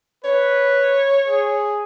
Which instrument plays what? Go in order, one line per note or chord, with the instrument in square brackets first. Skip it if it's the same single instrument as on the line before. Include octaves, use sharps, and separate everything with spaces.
[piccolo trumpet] B4 [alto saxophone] C#5
[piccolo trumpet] G#4